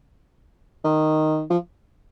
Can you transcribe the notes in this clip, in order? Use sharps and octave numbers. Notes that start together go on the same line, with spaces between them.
D#3
F3